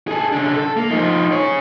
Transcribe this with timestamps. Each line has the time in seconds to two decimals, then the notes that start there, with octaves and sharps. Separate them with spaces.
0.08 G#4 A4
0.32 C#3 D4
0.56 A4
0.77 A#3
0.90 F3 D#4
1.32 G#4 C#5